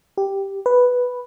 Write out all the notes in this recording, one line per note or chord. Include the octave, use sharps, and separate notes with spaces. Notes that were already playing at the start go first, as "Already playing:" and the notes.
G4
B4